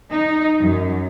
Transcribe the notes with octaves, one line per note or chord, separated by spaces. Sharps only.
D#4
F#2